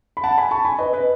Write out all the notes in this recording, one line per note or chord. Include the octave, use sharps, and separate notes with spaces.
B5
F#5 A5
G#5 B5
A5 C#6
G#5 B5
B4 D#5
B4 D#5